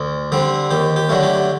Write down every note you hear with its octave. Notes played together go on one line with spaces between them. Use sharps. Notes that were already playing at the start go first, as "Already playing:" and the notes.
Already playing: D2
D3 G3 C4
D#2 G4
G4
D3 F#3 A3
G4